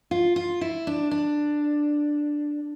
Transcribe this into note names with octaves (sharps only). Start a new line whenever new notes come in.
F4
F4
E4
D4
D4